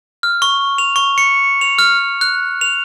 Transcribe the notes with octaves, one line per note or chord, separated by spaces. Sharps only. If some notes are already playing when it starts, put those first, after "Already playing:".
F6
C#6
F7
C#6
C#7
F7
F6
F#6
F7